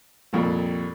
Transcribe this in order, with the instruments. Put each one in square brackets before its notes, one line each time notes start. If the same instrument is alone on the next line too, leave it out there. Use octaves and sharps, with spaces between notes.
[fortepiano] C2 F2 A#2